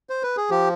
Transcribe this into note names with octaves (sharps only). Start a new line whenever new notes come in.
C5
B4
G#4
F3 G4